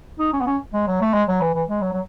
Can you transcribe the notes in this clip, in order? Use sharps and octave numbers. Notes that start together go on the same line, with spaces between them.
D#4
C#4
B3
C#4
G#3
F#3
A3
G#3
F#3
E3
E3
G#3
F#3
F#3